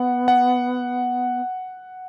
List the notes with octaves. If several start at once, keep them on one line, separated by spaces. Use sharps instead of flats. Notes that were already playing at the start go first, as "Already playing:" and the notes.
Already playing: B3 F#5
F#5